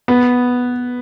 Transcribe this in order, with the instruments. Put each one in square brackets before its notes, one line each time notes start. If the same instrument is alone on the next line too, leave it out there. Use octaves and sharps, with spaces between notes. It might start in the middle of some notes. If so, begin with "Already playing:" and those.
[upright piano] B3